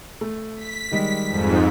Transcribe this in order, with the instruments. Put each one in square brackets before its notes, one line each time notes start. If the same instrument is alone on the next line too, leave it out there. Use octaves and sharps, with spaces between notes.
[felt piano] A3
[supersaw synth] B6
[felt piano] D#3 G3 G#3
[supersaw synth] F2 G#2